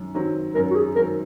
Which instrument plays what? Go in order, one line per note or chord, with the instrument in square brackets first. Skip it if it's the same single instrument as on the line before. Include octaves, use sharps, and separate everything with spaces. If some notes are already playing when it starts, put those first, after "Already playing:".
Already playing: [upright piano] F#2 D#3
D#3 F#3 C4
[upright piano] F#2 [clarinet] A#4
[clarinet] F#4
G#4
[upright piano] D#3 F#3 C4 [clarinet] A#4